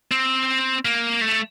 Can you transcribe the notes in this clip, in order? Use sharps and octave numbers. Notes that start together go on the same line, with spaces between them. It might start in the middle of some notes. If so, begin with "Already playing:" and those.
C4
A#3
A3